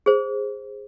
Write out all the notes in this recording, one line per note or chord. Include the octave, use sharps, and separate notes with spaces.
G#4 C5